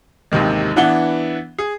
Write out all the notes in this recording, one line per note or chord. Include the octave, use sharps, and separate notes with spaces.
A1 D#2 C3 D#3 G#3
E3 B3 D4 E4 F#5 G7
G#4